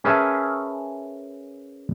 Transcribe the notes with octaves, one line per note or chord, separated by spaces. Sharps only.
C#4 G#4 A#4 B4 E5 A5